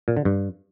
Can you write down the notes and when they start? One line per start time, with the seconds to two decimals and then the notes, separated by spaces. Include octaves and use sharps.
0.08 A#2
0.17 D3
0.25 G2